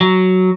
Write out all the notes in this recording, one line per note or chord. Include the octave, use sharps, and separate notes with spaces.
F#3